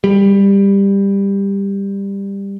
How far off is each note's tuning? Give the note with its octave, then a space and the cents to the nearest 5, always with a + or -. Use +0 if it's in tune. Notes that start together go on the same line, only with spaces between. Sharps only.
G3 +15